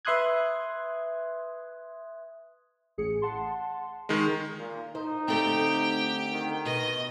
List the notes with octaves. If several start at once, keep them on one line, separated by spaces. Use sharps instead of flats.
B4 E5 C6 D#6 F#6 G#6
A1 G#4 C#7
F#5 A5 C6
D#3 G#3
A#2
D#4 C5
D3 A3 C4 G4 G5
D#3
B2 D#5